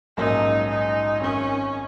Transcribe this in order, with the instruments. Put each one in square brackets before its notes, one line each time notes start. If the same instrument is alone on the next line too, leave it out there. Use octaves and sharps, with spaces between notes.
[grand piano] A#1 G#2 F#3 A#3 C#4 [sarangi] D#4
[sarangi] D#4
[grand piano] G#1 F#2 D#3 [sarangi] C#4